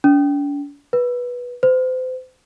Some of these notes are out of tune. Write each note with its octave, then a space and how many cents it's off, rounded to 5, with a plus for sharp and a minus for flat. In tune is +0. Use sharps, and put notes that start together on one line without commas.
D4 -45
B4 -15
C5 -35